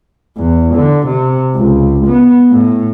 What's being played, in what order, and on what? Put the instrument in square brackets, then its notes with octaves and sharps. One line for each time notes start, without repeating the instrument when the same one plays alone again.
[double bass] E2
D3
C3
C#2
B3
A2